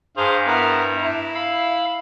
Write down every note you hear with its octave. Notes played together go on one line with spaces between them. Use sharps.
G2 G#4 C5 F5 A#5
B3 E4 A#4
E4
F5 B5 E6